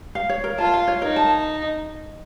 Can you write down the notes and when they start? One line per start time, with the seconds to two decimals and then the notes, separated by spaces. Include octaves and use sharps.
0.15 F5
0.29 C#5
0.44 A#4
0.58 F4 A5
0.74 F5
0.88 C#5
1.02 D#4 A#4
1.16 A5